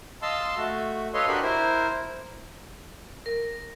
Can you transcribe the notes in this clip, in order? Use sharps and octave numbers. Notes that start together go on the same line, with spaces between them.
D#5 F5 A5 C6 E6
A3 F#4
A4 B4 C#5 D#5 F5 C6
D4 F#4 G4 A#4 D#5 B5
E4 A#4 C5
A#4